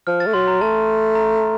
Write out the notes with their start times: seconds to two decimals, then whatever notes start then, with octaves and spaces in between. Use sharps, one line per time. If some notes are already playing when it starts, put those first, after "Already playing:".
0.07 F3 F6
0.20 A6
0.26 A3
0.33 F#3 C6
0.48 A#5
0.61 A3 A5
1.15 A#5